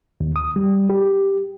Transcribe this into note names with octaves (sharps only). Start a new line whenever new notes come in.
D#2
D#6
G3
G4